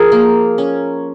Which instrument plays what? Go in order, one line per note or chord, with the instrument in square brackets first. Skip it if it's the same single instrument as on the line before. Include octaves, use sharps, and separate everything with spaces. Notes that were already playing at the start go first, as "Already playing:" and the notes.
Already playing: [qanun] F3 G#4 A#4
A#3
C#4